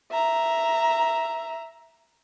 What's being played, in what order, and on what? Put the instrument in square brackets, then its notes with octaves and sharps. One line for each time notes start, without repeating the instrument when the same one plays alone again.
[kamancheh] E5 A#5